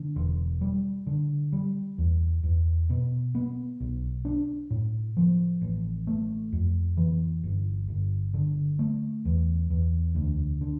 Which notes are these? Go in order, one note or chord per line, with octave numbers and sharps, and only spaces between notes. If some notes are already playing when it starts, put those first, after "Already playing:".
Already playing: D3
E1
G3
D3
G3
E2
E2
B2
B3
B1
D4
A2
F3
A1
A3
F2
E3
G1
G1
D3
A3
E2
E2
D2
D3